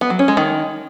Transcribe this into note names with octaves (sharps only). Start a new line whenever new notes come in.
B3
F#3
C#4
G#3
D#3